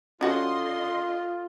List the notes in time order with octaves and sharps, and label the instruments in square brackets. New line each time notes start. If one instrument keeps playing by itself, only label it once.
[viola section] D3 D#5 C6 [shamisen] C#4 F#4 F#5 [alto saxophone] F4